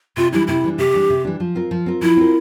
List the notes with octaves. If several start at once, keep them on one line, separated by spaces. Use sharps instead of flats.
C3 F4
E3 G3 D4 E4
C3 E4
E3 G3 D4
C3 G4
E3 G3 D4
C3
E3 G3 D4
F3
C4 F4 A#4
F3
C4 F4 A#4
F3 E4
C4 F4 A#4